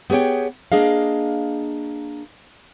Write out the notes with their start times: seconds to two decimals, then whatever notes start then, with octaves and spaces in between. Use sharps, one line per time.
0.10 B3 G4 G#4 C#5 G5
0.72 A#3 D4 G#4 D#5 F5